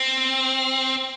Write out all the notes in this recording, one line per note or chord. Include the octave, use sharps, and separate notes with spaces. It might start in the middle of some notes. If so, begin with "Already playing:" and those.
Already playing: C4